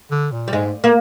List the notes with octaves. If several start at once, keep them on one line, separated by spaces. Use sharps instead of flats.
D3
A#2
G3
G#2 G#3
A#3